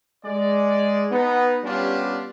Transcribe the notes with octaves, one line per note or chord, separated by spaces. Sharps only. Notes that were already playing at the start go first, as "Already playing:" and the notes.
G#3 D5
B3 D#4
G3 B3 C#4 D4 F4 G4